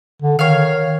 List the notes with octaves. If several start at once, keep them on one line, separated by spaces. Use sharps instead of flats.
D3
D#3 C#5 F5